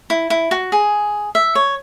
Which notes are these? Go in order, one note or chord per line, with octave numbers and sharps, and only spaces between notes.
E4
E4
F#4
G#4
E5
C#5